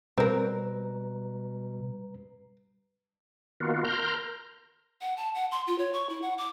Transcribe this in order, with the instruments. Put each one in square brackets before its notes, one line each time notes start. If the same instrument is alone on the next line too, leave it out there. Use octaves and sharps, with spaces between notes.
[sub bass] B2 [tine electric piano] G3 B4 A#5 [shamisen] C4 A#4
[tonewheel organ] D#3 A#3 B3 F4 F#4
A#4 A#5 C6 F6 G6
[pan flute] F#5
A5
F#5
C6
F4
C#5
C#6
E4
F#5
D6